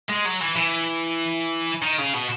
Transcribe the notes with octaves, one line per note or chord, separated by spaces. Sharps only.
G#3
F#3
E3
E3
D#3
C#3
B2